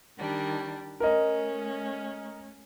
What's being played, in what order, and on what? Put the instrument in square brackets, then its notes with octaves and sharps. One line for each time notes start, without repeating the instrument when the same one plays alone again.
[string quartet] D#3 G3 D4
[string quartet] A3 C#4 [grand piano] A#4 D#5